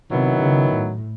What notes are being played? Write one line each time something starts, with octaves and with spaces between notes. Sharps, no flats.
C3 D#3 F#3 B3 E4
C#3
A2